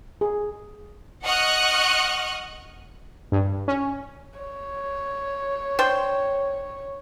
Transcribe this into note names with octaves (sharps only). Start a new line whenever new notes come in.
G#4
D#5 F#5 C#6 D#6 F6 F#6
G2
C#4
C#5
D4 C5 G5